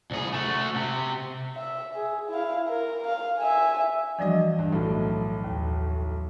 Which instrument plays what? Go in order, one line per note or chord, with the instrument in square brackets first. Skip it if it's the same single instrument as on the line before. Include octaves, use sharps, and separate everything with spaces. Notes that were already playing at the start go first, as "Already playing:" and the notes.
[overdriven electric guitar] C2 G#4
A3 F#4
C3
[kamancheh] E5
G#4
E4 F5
A#4
F5
E5 G#5
[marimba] E3 F3 G3 [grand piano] D4 F#4 D#5
[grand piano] G2
B1 A2
[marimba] D#2